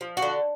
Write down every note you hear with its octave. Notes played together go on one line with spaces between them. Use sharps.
F3
F#4
D3